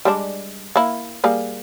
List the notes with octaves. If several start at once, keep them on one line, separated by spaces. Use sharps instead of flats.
G3 G#3 D4
A#3 E4
G3 A#3 G#4